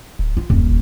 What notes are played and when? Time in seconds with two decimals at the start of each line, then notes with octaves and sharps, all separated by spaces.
0.19 D1
0.37 F4
0.50 D#1 F#2
0.67 F#1